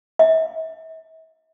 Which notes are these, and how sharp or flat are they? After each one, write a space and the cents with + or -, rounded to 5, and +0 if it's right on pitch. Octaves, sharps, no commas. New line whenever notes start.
E5 -45